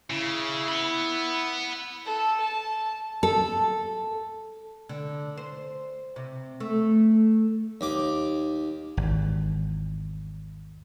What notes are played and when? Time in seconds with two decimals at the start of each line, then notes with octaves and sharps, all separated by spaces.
0.10 C#3 E4
0.68 F#5 B5
2.05 A4
2.40 A5
3.23 A4
4.89 D3
5.37 C5
6.16 C3
6.60 A3
7.81 D#2 D6
8.97 G#1 E2